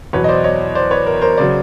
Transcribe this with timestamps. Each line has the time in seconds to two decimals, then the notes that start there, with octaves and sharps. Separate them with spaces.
0.13 E2 B2 F#3 B4 C#5
0.24 D#5
0.28 C5 D5
0.44 C#5 D#5
0.75 C5 D5
0.91 B4 C#5
1.06 A#4
1.22 A#4 C5
1.37 C#3 F#3 C5 D5